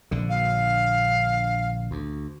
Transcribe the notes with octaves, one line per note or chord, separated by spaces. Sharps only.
A#1 D3
F5
D2